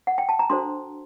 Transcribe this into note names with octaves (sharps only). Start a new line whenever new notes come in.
F#5
G5
A5
A#5
D4 F#4 A4 C5 C6